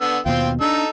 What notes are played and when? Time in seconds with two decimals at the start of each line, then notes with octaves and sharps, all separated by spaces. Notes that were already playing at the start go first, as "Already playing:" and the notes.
0.01 D3 B3 E6
0.26 D#2 B2 C4 F4 G5
0.61 D4 D#4 A4 E6